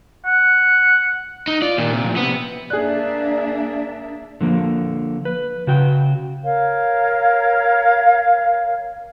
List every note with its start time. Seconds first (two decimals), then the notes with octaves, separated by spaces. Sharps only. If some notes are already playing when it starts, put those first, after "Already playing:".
0.25 F#5
1.48 D#4
1.62 F4 D5
1.78 A#2 D#3 A#3
1.92 C3
2.04 A2 F3
2.17 C3 B3
2.70 A#3 D4 G#4 D5 E5 F#6
4.41 D3 F3 A#3
5.25 B4
5.67 C#3 F#4 G5
6.43 A#4 C#5 F5